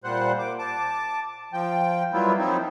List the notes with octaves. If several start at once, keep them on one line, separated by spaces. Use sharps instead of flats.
A#2 G3 C5 F#5
D6
A5 D6
F3 G5
F#3 G3 A#3 B3 E4 F4
F3 F#3 C4 D#4 E4